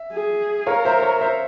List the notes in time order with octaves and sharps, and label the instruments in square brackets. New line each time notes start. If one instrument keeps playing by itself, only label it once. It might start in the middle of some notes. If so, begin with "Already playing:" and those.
Already playing: [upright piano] E5
[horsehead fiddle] G#4
[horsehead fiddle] A#4 [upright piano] C#5 F5
[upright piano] C5 E5
C#5
C5 E5